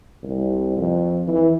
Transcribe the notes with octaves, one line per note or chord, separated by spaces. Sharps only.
C2
F2
E3